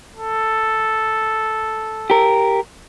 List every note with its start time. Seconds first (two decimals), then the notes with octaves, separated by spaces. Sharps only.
0.16 A4
2.10 G4 A#4